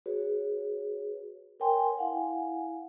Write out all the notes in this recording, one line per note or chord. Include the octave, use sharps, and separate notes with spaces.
F#4 G#4 B4 C#5
A#4 B4 C#5 G5 G#5 C6
E4 F5 F#5 G#5